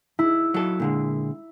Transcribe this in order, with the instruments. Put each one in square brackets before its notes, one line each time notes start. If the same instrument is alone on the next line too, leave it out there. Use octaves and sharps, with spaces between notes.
[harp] E4
[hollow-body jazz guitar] F#3 A4
A#2 D3 G#3